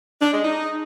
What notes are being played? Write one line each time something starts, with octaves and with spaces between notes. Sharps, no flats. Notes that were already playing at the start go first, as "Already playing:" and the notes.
D4
G#3
D#4